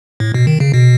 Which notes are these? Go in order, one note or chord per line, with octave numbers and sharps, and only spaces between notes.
A2
B2
D#3
C#3
B2